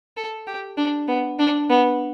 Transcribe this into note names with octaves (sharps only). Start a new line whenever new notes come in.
A4
G4
D4
B3
D4
B3